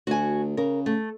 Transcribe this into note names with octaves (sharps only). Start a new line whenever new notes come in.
D2 F#4 G#5
C#3 A#4
A3